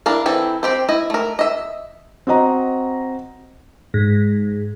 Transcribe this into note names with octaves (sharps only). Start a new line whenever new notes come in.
D4 E4 A#4 F5
E3 C4 E4 A4
C4 G4 C5
E4 D#5
A3 A#4
D#5 E5
C4 F#4 D#5 A#5
G#2